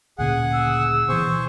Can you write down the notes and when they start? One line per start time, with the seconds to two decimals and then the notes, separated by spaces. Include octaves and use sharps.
0.18 D2 A#2 C#3 G#4 F#5
0.54 E6
1.09 B2 E3 G#4 C5 C#6